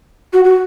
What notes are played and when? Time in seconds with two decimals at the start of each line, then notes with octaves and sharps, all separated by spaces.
0.33 F#4
0.44 F#4